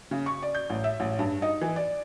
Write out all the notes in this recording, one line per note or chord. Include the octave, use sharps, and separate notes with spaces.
C#3
C#6
D5
G6
A1
E5
A1
G2
D#4
E3
D5